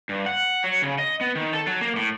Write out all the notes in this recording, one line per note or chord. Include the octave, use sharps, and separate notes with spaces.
G2
F#5
F#3
C#3
D#5
B3
D#3
A4
F#3
A#3
A2